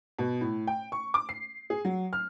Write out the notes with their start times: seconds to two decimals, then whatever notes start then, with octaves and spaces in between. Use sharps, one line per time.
0.19 B2
0.41 A2
0.67 G5
0.92 C#6
1.14 D6
1.29 C7
1.70 G#4
1.85 F#3
2.13 F6